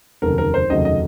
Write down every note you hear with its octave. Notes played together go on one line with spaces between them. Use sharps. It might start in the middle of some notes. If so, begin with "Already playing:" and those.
F1 D#2 C#3 F#3 A3 A#4
A#4
C5
F1 D#2 C#3 F#3 A3 D#5
D#5